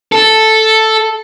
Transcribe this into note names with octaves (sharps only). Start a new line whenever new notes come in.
A4